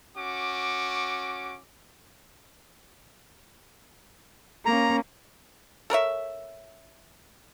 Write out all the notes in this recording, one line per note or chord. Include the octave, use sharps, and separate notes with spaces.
C#4 F#4 D6
A#3 C#4 A#5
A4 A#4 C#5 E5